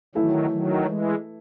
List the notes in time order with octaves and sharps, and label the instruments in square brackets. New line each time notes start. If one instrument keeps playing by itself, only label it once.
[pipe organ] D#3 F#3 [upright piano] E3 A3 E4 A4
[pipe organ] D#3 F#3
E3 G#3